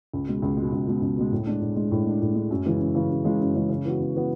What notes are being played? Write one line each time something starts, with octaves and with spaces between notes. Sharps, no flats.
C#2
B2 G#3
C#2
B2 G#3
C#2
B2 G#3
C#2
B2 G#3
A2
G#3 D4
A2
G#3 D4
A2
G#3 D4
A2
G#3 D4
F#2
C#3 E3 G#3
F#2
C#3 E3 G#3
F#2
C#3 E3 G#3
F#2
C#3 E3 G#3
C#3
E3 B3 F#4
C#3
E3 B3 F#4